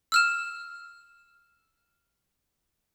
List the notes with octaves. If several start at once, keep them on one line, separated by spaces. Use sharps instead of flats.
E6 F6 E7